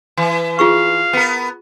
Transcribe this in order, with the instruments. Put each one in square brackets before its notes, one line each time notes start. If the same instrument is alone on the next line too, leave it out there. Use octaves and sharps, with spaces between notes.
[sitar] E3
[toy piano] F4 G#4 C#6 [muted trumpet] F5
[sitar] B3 A#4